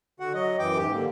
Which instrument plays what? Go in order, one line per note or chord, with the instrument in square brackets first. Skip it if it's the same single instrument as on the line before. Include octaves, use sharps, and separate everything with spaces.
[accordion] D3 F#4 F#5
F#3 D#5
F#2 E3 G5 D6
G#2 G4
D3 A#3